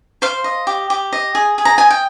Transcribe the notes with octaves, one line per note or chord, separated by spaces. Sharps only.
C5 F5
D#5
G4
G4
D#5
G#4
G#4
A#5
D#5 G#5
G5